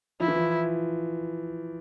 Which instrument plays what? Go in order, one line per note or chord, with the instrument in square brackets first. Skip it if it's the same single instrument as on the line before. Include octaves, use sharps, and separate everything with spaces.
[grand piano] F3 [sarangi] E4
[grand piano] E3
F3